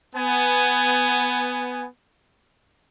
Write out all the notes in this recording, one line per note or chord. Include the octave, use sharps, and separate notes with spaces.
B3 G#5